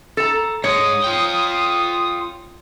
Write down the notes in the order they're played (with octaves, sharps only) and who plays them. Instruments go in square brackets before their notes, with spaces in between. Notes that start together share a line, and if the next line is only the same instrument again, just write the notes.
[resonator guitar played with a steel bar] A4 A#5
[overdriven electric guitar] G#2 G#3 [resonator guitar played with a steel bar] C#5 [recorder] D#6
[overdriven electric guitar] F4 G5